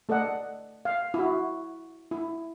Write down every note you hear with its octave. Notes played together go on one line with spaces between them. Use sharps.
A3 A4 D5 D#5 F#5
F5
E4 F#4
E4